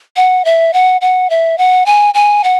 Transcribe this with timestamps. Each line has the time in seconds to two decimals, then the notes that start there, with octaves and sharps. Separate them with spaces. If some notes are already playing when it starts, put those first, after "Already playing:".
0.16 F#5
0.45 E5
0.73 F#5
1.01 F#5
1.30 E5
1.58 F#5
1.86 G#5
2.14 G#5
2.44 F#5